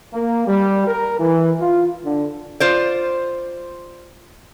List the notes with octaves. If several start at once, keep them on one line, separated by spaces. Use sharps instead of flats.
A#3
G3
A#4
E3
F4
D3
F4 C5 D5